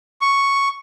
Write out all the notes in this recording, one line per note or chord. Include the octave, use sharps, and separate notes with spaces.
C#6